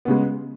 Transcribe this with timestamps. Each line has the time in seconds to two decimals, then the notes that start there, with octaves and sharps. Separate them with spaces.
0.05 B3
0.08 C#3
0.11 G#3